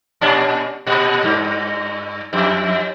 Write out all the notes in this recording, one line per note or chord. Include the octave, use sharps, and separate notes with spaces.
A#2 C#4 D4
A#2
G2
F2